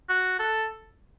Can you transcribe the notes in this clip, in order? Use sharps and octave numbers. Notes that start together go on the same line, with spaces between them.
F#4
A4